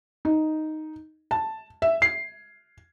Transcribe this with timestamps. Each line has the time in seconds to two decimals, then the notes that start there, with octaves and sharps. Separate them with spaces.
0.25 D#4
1.31 A5
1.82 E5
2.02 C7